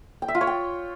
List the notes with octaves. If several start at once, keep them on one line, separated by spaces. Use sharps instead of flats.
G5
E5
F4
C#5
G5